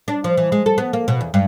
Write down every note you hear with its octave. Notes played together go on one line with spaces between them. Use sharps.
D4
F3
E3
G#3
A4
B3
A#3
B2
E2
G2